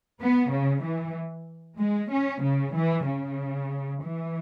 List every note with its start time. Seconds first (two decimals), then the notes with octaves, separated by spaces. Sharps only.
0.20 B3
0.51 C#3
0.83 E3
1.78 G#3
2.12 C#4
2.42 C#3
2.75 E3
3.06 C#3
4.03 E3